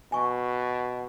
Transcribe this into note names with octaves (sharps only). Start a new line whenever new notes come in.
B2 G#5 C#6